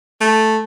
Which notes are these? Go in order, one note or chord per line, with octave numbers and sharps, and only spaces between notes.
A3